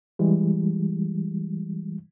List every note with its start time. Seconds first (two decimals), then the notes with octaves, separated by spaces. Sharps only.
0.19 E3 G3 G#3